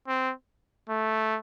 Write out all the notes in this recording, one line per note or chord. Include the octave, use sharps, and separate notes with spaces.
C4
A3